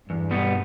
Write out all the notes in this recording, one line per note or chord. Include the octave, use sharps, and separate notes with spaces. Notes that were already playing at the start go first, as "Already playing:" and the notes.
E2 G2
B2 G3 B3